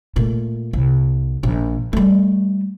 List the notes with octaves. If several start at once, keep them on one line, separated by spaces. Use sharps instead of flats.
A#2 A3
C2
A#1
G3 A3